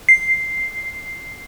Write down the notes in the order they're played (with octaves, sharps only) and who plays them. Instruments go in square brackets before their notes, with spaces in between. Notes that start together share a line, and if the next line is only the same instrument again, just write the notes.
[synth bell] C7